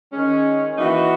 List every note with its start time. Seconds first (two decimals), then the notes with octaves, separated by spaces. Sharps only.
0.13 D#3 G#3 C#4
0.78 E3 A#3 D#4 F#4